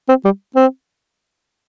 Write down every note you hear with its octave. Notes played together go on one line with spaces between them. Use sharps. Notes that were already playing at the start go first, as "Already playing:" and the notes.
C4
G3
C4